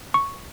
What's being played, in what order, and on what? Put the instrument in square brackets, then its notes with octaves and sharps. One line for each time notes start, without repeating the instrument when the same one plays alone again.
[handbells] C#6